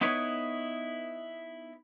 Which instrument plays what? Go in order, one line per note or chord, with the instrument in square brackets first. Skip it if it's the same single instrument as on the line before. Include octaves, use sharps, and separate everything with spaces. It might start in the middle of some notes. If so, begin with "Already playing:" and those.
[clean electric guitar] B3 D#4 E4 B4 C#5